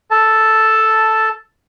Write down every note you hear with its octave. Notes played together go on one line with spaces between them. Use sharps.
A4 A5